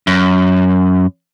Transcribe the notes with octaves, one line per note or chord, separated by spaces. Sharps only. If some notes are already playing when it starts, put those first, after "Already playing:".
F#2